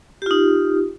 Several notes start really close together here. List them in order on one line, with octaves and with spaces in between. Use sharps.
G4 F4 D#4